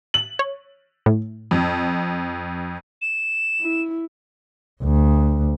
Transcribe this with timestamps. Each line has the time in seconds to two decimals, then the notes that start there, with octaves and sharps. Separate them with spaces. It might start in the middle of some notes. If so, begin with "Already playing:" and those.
0.14 F#7
0.39 C#5
1.06 A2
1.51 F2
3.02 E7
3.61 E4
4.83 D2